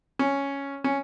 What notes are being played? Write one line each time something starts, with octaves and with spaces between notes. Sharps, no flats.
C#4
C#4